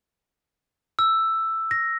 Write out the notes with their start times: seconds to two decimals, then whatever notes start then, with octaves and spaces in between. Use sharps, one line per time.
0.99 E6
1.71 A#6